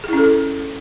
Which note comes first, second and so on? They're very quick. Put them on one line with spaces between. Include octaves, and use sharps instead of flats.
G#4 E4 C#4 A4